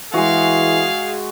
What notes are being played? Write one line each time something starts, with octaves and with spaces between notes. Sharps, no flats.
E3 G#3 F#4 G#4 F5